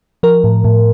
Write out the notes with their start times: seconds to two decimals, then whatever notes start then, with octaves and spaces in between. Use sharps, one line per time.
0.23 F3 A#4
0.44 A2
0.64 A2